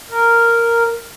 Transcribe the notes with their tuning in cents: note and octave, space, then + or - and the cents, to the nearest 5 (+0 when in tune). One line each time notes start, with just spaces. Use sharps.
A#4 -5